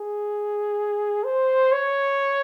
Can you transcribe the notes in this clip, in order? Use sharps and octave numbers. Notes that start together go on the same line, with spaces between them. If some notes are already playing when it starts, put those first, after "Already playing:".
Already playing: G#4
C5
C#5